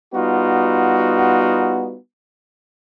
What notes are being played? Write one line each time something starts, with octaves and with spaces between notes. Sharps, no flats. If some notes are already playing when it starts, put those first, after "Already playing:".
G3 B3 D#4 F4 F#4